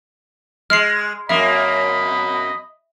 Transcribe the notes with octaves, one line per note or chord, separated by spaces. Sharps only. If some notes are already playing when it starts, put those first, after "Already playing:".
G#3 F6 C7
F#2 A#3 D#5 E5 B5